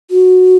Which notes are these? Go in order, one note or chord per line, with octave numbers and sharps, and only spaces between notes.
F#4